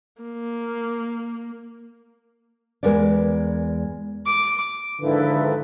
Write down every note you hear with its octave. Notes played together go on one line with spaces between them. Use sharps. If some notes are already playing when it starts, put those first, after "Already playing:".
A#3
E2 G#3 A#4 B4 D5
D6
G#2 D3 D#3 F3 E4 A4 B4